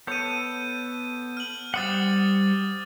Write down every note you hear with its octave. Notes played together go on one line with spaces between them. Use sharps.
B3 A4 C#5 G6 D#7
F6 F#7
G3 C5 F#5 D6 D#6 A6